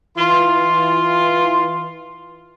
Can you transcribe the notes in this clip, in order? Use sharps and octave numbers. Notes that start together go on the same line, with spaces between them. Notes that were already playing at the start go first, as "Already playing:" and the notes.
E3 F4 C6